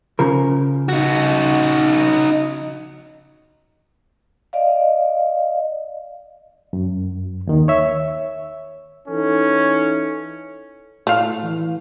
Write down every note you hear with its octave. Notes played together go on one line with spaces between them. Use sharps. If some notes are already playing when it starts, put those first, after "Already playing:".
C#3 F3 A#4
D#4 F#4
D5 D#5 F5
F#2
D#2 D#3
C#5 E5
E3 C#4 D#4 A4
A2 A3 F5
E3